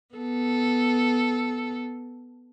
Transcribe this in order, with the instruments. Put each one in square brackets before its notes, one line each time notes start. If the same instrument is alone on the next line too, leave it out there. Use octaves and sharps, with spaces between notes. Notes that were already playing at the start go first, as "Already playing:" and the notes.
[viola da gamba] B3 A4